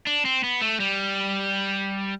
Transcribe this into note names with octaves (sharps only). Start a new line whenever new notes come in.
D4
C4
B3
A3
G3